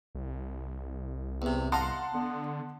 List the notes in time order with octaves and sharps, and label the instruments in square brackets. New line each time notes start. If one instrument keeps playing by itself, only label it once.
[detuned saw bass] C2
[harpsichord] E2 C3
[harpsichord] D#5 F5 A#5 [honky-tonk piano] F#5 A5 C6
[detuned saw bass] D3 [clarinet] B3